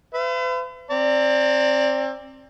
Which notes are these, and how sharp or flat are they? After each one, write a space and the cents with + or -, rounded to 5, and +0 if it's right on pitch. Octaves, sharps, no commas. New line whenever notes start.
B4 +45 E5 +45
C4 +30 D5 +0 A#5 -40